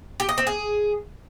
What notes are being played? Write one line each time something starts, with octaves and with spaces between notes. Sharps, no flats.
G4
D#5
C4
G#4